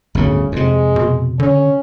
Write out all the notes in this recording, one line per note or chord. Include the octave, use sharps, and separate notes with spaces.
G1 D2 A2 C#3
F2 C3 G#3
B2
D3 C#4